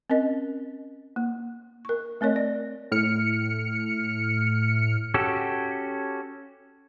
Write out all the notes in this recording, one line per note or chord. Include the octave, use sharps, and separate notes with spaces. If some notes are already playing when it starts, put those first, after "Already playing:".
C4 C#4 A#4 D#5
A#3
A#4 C#6
A3 C4 A#4 C#5 D#5
D5
A2 F6 C#7
C#4 F#4 G4 A4